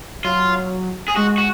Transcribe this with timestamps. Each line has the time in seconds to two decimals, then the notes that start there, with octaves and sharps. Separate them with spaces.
0.24 F#3 F4
1.08 G#4
1.16 G#3 F#4
1.38 F#4